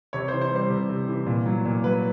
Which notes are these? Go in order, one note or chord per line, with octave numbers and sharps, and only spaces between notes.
C3 C#5
C5
E3
C5
G3 C5
C3
C3
E3
A#2
F#3
A#2
F#3 B4